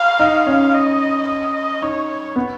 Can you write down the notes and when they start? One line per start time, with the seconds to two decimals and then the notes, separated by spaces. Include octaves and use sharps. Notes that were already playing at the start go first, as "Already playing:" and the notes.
Already playing: F5
0.19 D#4
0.46 C#4
0.74 D#5
1.28 D#5
1.82 D#4 C#5
2.36 B3